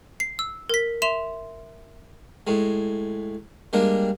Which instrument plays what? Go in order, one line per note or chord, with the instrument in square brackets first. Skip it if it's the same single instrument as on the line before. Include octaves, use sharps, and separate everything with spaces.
[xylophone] C7
E6
A#4 B6
E5 C6 E7 F7
[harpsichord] A2 G#3
G3 G#3 A#3 D4